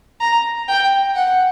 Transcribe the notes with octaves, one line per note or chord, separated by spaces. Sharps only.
A#5
G5
F#5